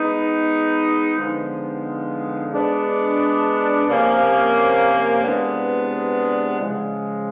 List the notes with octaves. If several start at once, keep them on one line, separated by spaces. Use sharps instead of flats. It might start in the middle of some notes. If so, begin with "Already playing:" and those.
Already playing: G#3 B3 D#4
D3 F3 G#3 B3 D#4
G#3 B3 D4
C3 F3 A#3 C#4
C3 E3 G#3 B3 D4
C#3 F3 G#3